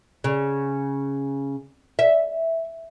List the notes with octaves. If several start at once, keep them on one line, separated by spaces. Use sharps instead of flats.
C#3
E5